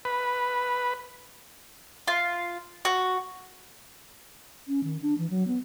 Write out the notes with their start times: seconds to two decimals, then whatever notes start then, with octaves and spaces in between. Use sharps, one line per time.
0.05 B4
2.08 F4
2.85 F#4
4.68 C#4
4.84 D#3
5.02 D4
5.18 E3
5.30 F#3
5.47 B3